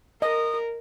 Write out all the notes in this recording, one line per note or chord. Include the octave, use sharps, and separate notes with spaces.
A#4 D#5 D#6